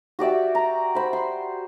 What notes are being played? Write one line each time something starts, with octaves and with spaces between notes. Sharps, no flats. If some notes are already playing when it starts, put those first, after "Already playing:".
F#4 G4 D5 E5
A#5
C5 B5
C6